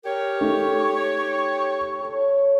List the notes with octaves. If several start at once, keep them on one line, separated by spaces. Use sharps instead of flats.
G4 A#4 C#5
A3 D#4 C#6
A4 C#5